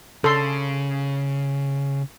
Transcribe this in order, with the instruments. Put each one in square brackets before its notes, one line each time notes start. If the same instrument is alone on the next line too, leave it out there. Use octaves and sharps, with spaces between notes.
[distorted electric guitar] C#3 [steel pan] A4 C6